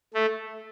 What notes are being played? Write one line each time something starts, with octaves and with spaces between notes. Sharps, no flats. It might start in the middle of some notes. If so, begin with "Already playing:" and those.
A3